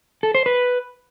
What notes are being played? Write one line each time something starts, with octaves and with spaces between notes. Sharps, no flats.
A4
C5
B4